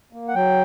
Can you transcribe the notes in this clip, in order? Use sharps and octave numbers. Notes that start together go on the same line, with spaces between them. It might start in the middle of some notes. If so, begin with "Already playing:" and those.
A#3
F#5
F#3 G5